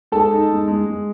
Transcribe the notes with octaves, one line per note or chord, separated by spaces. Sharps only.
G#3 A4 A5
D#4
G#3
G#3
G#3